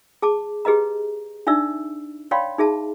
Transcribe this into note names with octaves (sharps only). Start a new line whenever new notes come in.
G#4 A5 D6
G4 G#4 B4 D#5 A#5
D4 D#4 D5 E5 E6
C#5 D5 F5 G5 B5 C6
D#4 G#4 E5 A5